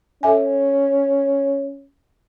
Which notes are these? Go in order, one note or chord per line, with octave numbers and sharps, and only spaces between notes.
C#4 A4 E5 G#5